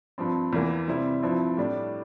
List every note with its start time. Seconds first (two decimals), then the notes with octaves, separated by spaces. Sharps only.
0.18 G2 F3 C4
0.53 E2 E3 A#3
0.88 C3 G3 C4 E4
1.23 G2 F3 C4 E4
1.57 A2 G3 D4